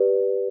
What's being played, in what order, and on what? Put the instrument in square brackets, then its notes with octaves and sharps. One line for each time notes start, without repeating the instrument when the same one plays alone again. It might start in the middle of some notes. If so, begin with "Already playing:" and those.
Already playing: [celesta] G4 B4 D5